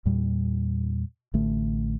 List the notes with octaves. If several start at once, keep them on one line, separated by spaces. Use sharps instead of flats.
E2 A#2 G3
A1 D3 A3